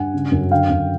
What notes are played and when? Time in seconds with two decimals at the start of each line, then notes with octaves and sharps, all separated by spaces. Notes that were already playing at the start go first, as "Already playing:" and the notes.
Already playing: G2 F#5 G#5
0.14 C#3
0.32 F#2
0.51 D3 F5 G5
0.70 F#2